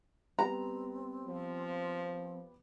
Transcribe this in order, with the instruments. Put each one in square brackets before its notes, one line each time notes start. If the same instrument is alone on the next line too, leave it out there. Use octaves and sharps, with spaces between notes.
[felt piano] G3 B3 G4 [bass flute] C4 [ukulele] A#5
[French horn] F3